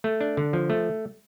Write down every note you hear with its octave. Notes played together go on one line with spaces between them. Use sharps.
A3
D4
D3
F3
A3